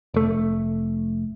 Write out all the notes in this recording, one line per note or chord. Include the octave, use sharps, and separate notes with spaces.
F1 A3